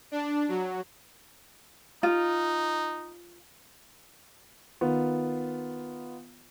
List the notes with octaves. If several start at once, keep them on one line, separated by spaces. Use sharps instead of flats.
D4
F#3
D#4 F4
D#3 B3 F4